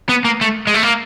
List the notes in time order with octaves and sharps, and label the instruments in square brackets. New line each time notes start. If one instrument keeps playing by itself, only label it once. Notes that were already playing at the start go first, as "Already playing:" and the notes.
[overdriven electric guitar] B3
A#3
A3
G#3
A3
A#3